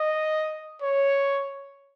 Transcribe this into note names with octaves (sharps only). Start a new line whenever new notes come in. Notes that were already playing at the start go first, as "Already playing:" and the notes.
Already playing: D#5
C#5